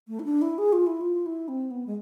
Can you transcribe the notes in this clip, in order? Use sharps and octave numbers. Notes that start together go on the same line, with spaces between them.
A3
E4
D4
E4
G#4
F4
E4
F4
E4
C4
B3
G#3